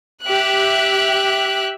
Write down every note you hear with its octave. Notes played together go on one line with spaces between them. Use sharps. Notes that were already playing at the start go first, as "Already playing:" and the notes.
G4 E5 F#6